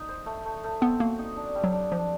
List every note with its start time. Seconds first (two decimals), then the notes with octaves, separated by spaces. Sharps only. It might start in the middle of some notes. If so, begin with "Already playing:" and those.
Already playing: D#4
0.09 C5
0.26 A3
0.45 A3
0.64 A3
0.81 B3 C4
1.00 A#3 F#4
1.18 D#4
1.36 D4
1.55 G3
1.64 F#3
1.73 D4
1.91 F3 D4